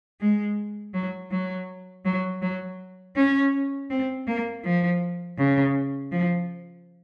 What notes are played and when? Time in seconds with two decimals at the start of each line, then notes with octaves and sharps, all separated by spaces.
0.20 G#3
0.94 F#3
1.31 F#3
2.05 F#3
2.42 F#3
3.16 C#4
3.90 C4
4.27 A#3
4.64 F3
5.38 C#3
6.12 F3